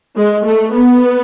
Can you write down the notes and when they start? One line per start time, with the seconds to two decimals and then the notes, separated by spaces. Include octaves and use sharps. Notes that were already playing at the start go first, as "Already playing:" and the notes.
0.16 G#3
0.45 A3
0.73 B3